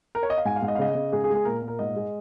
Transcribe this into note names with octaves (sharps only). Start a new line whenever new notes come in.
A#4
C#5
D#5
F5
G#2 G#5
F5
G#2
D#5
F5
C#3 D#5
C#3
G#2 G#4
G#4
G#3
G#4
A#2 A#4
A#2
A#4
G#2 D#5
G#3